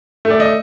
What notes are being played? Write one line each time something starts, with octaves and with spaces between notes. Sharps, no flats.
A3
D5
D#5